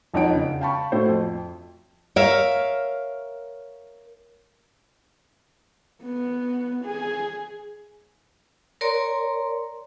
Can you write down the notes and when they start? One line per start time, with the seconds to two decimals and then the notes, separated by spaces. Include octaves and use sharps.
0.13 E1 F2 D#4 C#5 F#5 D7
0.35 C#3
0.61 F5 G5 A5 B5 C#6
0.92 A2 F#4 A4 C5
1.09 F2
2.16 A#4 C#5 E5 F5
6.04 B3
6.85 G#4
8.81 A#4 C#5 D5 A#5 C6